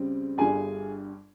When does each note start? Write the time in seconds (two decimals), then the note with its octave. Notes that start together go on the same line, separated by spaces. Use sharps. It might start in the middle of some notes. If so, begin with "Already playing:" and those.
Already playing: C#2 C#3 G3 C4
0.38 G1 G2 G3 G#4 G#5